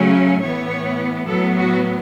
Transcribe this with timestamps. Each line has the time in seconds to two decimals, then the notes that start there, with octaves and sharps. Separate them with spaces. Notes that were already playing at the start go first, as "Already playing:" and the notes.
Already playing: C#3 F#3 A3 C#4
0.42 A2 E3 B3 C#5
1.27 A2 F#3 B3 A4
1.55 F#4